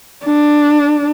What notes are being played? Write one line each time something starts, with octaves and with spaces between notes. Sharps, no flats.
D4